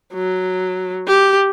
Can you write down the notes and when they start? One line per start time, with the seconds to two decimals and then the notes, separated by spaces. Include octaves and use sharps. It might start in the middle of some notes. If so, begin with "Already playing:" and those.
0.14 F#3
1.08 G4